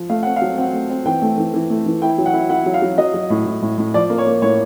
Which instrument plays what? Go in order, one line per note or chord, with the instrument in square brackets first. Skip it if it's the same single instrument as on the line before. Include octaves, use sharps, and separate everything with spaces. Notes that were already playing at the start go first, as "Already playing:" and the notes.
Already playing: [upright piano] F3
A3 F5
C4 F#5
F5
F#3
C4 F#5
A3
C4
E3 G5
A3
E3
E3
A3
E3
E4 G5
F#3
F#5
E4
E4 F#5
F#3
F5
F#3
F#3 D#5
F#3
A2
A2
A2
A2
F3 D5
A#3
C#5
A#3
A2 C#5